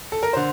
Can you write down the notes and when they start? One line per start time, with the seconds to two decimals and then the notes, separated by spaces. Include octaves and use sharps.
0.12 A4
0.23 A#4
0.33 D3 C5